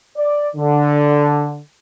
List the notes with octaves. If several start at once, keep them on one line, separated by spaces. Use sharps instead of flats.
D5
D3